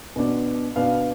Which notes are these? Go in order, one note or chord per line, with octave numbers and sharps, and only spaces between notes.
B2 B3 D4
B2 B3 D4 F5